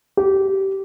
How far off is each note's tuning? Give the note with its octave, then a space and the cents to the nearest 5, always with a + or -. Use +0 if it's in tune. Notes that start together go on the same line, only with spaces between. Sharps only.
G4 -20